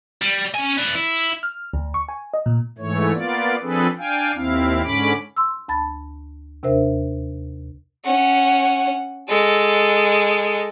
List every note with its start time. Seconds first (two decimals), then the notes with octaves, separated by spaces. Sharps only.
0.22 G3
0.55 C#4 G#5
0.78 B4 D5
0.95 E4
1.43 F6
1.74 D2
1.94 C#6
2.09 G#5
2.34 D#5
2.46 A#2
2.78 G#2 E3 A3 C#5
3.13 A#3 B3 F4 D5
3.62 F3 C4 D4 G#4 A4 B4
3.98 D4 F5 G5 G#5
4.35 D#2 C4 E4 F5
4.84 G#2 D3 C#4 B5 D6
5.36 C6 E6
5.68 D2 A5 B5 A6
6.63 D#2 C3 D4 A#4 C5 E5
8.05 C#4 F#5
9.29 G#3 A4